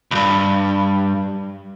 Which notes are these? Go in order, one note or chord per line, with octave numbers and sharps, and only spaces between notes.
C#2 G2